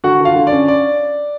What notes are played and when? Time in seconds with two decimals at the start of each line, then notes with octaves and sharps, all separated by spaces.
0.04 D3 F#4 F#5
0.20 D3 F4 F5
0.36 D3
0.47 D5
0.52 C#4
0.68 D5